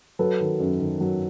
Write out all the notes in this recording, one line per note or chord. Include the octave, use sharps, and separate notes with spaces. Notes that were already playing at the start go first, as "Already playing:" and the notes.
F#3 A4 B4
D#3
F#2
D#3
F#3